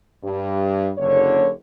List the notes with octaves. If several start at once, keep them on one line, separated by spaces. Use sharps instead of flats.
G2
F#1 D3 C#5